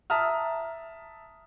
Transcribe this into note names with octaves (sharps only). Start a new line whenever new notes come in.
E5 A5 A#5 D#6 F6